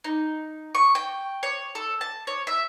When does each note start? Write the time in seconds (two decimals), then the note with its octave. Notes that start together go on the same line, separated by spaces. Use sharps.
0.04 D#4
0.75 C#6
0.95 G5
1.43 C#5
1.75 A4
2.01 A5
2.27 C#5
2.47 E5